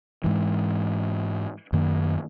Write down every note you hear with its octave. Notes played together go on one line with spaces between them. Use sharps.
G#2 E3
F#2 D#3 A#3